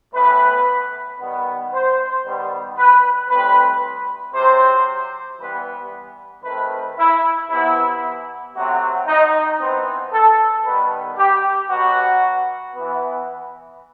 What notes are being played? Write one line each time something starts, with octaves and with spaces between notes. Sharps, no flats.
A2 E3 B3 B4
D#3 G3 B3
C5
D#3 G3 B3
B4
A2 G3 C4 B4
C3 F#3 C4 C5
E3 G3 B3 B4
D#3 A3 C4 B4
E4
C3 E3 B3 E4
C3 F#3 A3 C4 F#4
D#4
E3 B3 C4
A4
D#3 G3 B3 B4
G4
B2 F#3 B3 F#4
E3 B3